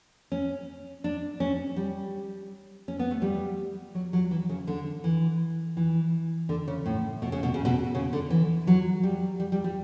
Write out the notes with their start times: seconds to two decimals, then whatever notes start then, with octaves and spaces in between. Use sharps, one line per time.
0.32 C#4
1.04 D4
1.40 C#4
1.76 G3
2.88 C#4
2.99 B3
3.11 A3
3.22 G3
3.95 F#3
4.13 F#3
4.31 E3
4.49 C#3
4.67 D3
5.04 E3
5.77 E3
6.49 D3
6.68 C#3
6.86 A2
7.22 B2
7.32 C#3
7.43 B2
7.54 C#3
7.65 B2
7.95 C#3
8.13 D3
8.30 E3
8.67 F#3
9.03 G3
9.40 G3
9.52 G3
9.64 G3